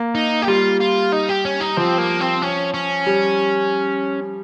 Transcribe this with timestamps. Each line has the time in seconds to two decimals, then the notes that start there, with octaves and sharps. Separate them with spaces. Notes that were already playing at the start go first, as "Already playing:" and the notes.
Already playing: A#3
0.15 D#4
0.42 G4
0.47 G3 F4
0.81 F4
1.13 D#4
1.29 G4
1.45 C#4
1.60 D#4
1.77 F3 C4
1.98 A#3
2.21 C4
2.42 C#4
2.74 C#4
3.06 G3